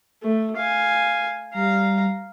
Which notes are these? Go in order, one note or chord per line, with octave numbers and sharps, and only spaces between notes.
A3
F5 G#5
G3 F5 A#5